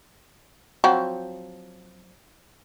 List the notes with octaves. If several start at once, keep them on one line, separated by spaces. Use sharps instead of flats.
F3 F#3 C4